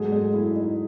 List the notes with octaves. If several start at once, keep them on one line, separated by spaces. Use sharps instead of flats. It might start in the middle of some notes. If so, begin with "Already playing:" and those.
Already playing: G#2 F#3 G#3 A3 G#4
G#3 G#4
E4
D#4